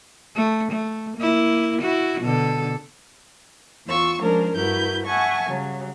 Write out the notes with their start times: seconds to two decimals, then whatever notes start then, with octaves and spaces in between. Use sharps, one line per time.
0.36 A3
0.72 A3
1.18 A#3 E4
1.82 E4 F#4
2.22 B2 D3 A4
3.86 E2 F4 C#6 E6
4.19 F3 G#3 C#4 D4 A#4 C5
4.55 G2 E4 F#4 A#4 B4 G6
5.06 E5 F#5 G#5 A5 C#6
5.47 C#3 F#3 G3